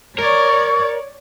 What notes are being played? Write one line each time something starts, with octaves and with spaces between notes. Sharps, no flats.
A#4 C#5 D5 C#6